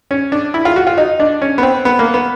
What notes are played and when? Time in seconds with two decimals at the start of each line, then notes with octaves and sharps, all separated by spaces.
0.11 C#4
0.32 D4
0.54 E4
0.65 F4
0.76 F#4
0.87 F4
0.98 D#4
1.20 D4
1.42 C#4
1.58 B3
1.63 C4
1.85 B3
1.99 A#3
2.14 B3